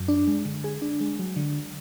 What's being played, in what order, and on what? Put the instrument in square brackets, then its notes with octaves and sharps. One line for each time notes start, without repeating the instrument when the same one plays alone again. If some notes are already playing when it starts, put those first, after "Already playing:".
Already playing: [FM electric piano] F#2
D4
G#3
D3
G#4
D4
G#3
F#3
D3